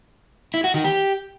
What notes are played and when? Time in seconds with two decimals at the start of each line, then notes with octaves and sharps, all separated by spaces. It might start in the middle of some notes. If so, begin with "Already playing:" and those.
0.54 E4
0.64 F#4
0.74 D#3
0.84 G4